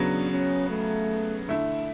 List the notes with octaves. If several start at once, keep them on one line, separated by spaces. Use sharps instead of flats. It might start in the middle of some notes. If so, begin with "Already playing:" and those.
Already playing: C#3 F#3 B3 D4
C#4
A3
D3 A3 E4